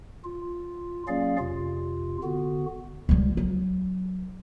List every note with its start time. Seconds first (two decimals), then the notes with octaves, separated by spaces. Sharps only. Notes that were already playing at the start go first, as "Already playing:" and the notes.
0.24 F4
1.08 F#3 A#3 C#4 G#4 D5 F5
1.39 F2 C3 F4
2.23 D3 B3 F#4
3.09 C#2 G3
3.37 F#3